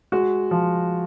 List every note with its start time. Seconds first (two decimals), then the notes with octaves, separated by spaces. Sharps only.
0.12 G#3 F#4
0.51 F3